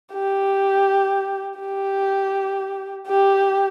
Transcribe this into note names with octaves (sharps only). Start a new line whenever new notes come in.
G4
G4
G4